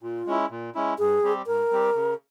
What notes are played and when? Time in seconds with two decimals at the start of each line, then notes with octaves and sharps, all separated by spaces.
0.03 A#2 F4
0.27 G#3 C#4 E4
0.51 A#2
0.75 G#3 C#4 E4
0.99 G2 G#4
1.23 G3 C4 G4
1.47 G2 A#4
1.71 G3 C4 G4
1.95 C#3